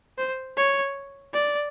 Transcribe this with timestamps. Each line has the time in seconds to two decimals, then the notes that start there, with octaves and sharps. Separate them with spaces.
0.18 C5
0.57 C#5
1.33 D5